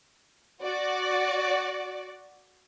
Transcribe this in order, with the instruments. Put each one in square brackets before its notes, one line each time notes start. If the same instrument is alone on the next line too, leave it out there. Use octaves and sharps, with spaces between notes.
[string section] F#4 D5